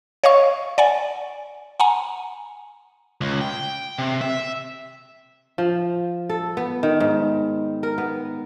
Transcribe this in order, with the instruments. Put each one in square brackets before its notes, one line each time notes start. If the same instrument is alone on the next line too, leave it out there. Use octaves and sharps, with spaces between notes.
[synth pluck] C#5 D#5 F5 C#6
D5 F#5 G#5
F#5 G#5 A#5
[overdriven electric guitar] C#2
G5
C3
E5
[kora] F3
A4
B3
D#3
G#2
A#4
B3